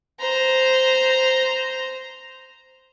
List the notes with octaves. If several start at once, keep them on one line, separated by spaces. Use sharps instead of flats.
C5 A#5